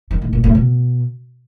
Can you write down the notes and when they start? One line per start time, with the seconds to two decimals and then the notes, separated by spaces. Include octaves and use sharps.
0.11 D#3
0.22 A2
0.33 A#2
0.44 A2
0.55 B2